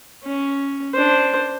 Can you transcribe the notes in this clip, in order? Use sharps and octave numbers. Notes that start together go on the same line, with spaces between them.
C#4
D4 C5